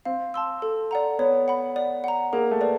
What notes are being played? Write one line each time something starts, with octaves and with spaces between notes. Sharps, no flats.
C4 F5
A5 C6 E6
A4
D5 F#5 A#5
B3 C#5
F#5 B5
D5
F#5 A#5
A#3 G#4
A3
B4 D5